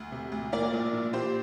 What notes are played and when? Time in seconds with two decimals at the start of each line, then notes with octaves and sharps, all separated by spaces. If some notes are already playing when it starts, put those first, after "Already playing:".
Already playing: D2
0.12 C3
0.32 D2
0.52 A#2 A#4 D5
0.73 A#1
0.93 A#2
1.13 A#2 G4 C5